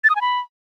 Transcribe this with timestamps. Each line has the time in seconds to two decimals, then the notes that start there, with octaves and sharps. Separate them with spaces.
0.04 A6
0.10 D#6
0.16 G#5
0.21 B5